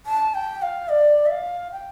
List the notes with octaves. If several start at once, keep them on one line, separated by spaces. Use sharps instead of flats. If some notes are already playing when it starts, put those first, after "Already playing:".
A5
G5
F5
D5
E5
F5
G5